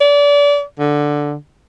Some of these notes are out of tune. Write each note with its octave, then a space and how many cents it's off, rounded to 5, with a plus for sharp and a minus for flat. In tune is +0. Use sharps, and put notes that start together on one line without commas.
D5 -30
D3 +0